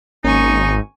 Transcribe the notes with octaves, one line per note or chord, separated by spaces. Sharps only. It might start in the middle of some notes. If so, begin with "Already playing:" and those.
G#1 A#3 C#4 D#4 A#4 G#5 C#6